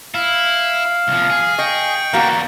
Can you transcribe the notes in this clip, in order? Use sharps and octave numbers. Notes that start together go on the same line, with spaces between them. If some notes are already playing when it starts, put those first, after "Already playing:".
E4 F5
C2 F3
G#4
D#5 G5 C#6
E2 G3 A#3 F#4